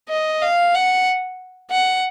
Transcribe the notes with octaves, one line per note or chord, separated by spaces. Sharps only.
D#5
F5
F#5
F#5